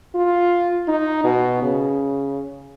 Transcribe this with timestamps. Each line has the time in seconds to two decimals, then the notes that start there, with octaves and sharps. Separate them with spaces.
0.15 F4
0.88 D#4
1.24 B2
1.63 C#3